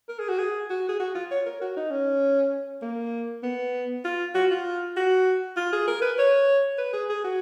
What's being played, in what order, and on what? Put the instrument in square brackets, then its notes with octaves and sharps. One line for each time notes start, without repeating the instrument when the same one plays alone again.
[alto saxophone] A#4
G#4
F#4
G#4
F#4
G#4
F#4
F4
C#5
A#4
F#4
D#4
C#4
A#3
B3
F4
F#4
F4
F#4
F4
G#4
A#4
B4
C#5
B4
G#4
G#4
F#4